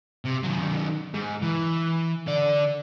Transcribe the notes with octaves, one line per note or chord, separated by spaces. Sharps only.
C3
D#3 F#3
G#2
E3
D3 D5